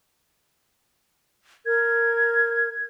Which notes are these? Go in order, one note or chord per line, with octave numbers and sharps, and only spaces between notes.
A#4 G#6